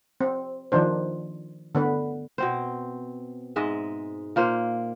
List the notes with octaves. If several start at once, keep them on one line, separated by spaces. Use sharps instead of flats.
C4
D#3 F3 D4 C5
D3 B3 B4
B2 C4 C5
G#2 G#3 D#5 E5
A#2 A#3 C5